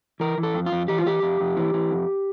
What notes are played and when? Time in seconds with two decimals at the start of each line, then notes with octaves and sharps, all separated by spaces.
0.20 E3 A#4
0.38 E3
0.43 A4
0.55 F2
0.66 F4
0.72 F2
0.88 E3 G4
0.98 F4
1.06 E3 G4
1.22 F2
1.41 F2
1.56 E3
1.74 E3
1.91 F2